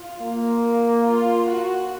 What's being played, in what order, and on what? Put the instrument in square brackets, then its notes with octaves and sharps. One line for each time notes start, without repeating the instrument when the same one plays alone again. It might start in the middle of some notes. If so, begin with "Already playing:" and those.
Already playing: [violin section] F4
[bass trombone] A#3
[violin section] F4
F#4